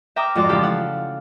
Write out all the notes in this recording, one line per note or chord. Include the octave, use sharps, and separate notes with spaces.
E5 G5 A#5 D6 D#6 F6
F2 G#2 F#4 D5 D6 F6
C#3 E3 F3 F4 G4 A4
F5 F#5